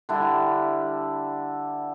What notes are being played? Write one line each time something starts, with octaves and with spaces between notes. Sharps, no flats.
D3 G3 D4 E4